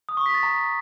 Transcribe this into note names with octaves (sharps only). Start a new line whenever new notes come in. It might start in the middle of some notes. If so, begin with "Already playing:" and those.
D#6
C#6
B6
A6
A#5